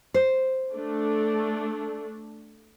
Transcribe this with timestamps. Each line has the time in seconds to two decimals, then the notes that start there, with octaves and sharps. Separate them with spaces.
0.14 C5
0.74 A3 D4